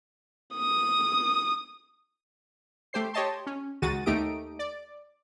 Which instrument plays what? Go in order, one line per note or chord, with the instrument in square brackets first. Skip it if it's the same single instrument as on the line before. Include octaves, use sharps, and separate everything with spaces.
[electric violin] D#6
[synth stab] A3 G4 C5 C7
G4 C#5 D#5 A5 C6
C#4
C#2 D#3 G#3 F#4 A6 D#7
D#2 A3 D#4 G4 D#6 D7
D5